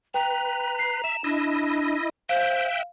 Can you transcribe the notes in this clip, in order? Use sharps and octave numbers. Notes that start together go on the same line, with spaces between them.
B4 G5 A#5
C7
E5 E7
D4 E4 D#5
C5 E5 F5 G5 F#6